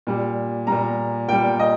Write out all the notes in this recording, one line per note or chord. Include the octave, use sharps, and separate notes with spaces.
A#2 G3
A#2 G3 A#5
A#2 G3 G5
D#5